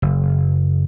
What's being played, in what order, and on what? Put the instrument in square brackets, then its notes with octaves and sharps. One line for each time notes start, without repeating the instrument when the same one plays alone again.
[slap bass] F#1